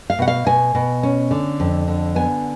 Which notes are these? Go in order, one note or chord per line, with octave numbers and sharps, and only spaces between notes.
F5
B2 F#5
F5
B2 G#5
B2
C#4
D3
F2
D3
B3 G#5